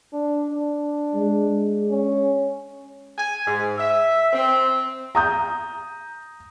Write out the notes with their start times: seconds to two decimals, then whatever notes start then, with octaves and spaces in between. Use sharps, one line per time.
0.13 D4
0.51 D4
1.15 G#3
1.91 C#4
3.17 G#5
3.47 G#2
3.78 E5
4.33 C4
5.15 A#5 D#6 G6